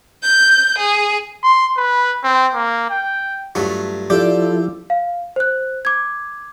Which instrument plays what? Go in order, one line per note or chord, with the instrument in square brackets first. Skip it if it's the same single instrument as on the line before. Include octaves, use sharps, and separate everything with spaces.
[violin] G6
G#4
[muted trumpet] C6
B4
C4
A#3
G5
[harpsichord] G2 F4 [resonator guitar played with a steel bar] F#3 A3
[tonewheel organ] F3 E4 [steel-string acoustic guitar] F4 A4 [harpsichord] G4 [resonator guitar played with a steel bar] D5
[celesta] F5
C5 F#6
D6 G#6